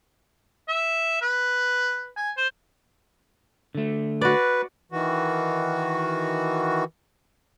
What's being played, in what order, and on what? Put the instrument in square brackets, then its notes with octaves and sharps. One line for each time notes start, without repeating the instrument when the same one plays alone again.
[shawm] E5
B4
G#5
C5
[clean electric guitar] D3 A3
[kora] F#4 D5 [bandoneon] B4
[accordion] D#3 E3 F#4